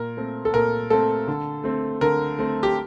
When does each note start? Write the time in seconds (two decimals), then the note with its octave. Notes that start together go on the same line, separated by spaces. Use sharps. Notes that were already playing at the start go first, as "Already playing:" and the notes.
Already playing: A#2 A#4
0.17 A3 C4
0.45 A4
0.54 A#2 A#4
0.90 A3 C4 A4
1.27 D3
1.64 A3 C4
2.01 D3 A#4
2.39 A3 C4
2.63 G4